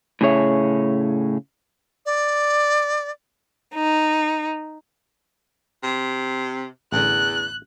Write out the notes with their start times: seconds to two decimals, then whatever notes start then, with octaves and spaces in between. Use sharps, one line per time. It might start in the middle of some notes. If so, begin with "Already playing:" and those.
0.21 A2 C#3 G#4 C#5 E5
2.06 D5
3.73 D#4
5.84 C3
6.92 A1 E2 D3 F#6